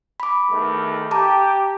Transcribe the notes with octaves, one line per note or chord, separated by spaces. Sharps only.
B5 D6
E2 D#3 A3
G4 A5 A#5 D6